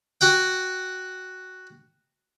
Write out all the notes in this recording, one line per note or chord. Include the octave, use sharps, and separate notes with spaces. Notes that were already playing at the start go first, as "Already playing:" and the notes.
F#4 F#5 G5